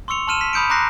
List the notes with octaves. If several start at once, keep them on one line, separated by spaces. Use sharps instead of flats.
C6 C#6 E6 C#7 F7
A5 C6 F6 D#7 E7
B6
B5 D#6 G6 C#7 D7
A#5 C6 D6 F#6 A#6 C7